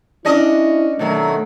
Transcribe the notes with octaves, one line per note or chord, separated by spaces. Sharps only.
C#4 D4 E4 D#5
B2 D#3 F#3 A3